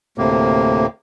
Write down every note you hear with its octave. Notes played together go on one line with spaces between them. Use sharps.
D2 A2 C3 A#3